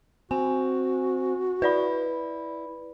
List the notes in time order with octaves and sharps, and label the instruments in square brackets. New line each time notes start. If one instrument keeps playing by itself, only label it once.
[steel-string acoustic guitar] C4 [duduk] F#4 [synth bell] G#5
[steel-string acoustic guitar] E4 [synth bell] B4 D5 B5